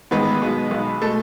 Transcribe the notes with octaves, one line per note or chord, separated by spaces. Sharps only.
A1 G#2 D#3 G#3 B3 B4
B1 B2 G#3
B1 B2 G#3
B2 G#3 A3 A4